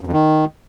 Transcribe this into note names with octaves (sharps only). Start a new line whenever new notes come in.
F#2
F2
D#3